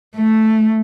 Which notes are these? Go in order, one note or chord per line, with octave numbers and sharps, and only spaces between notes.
A3